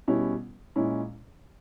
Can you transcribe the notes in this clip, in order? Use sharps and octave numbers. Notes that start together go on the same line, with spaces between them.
B2 G3 C#4 E4
A#2 G#3 C#4 E4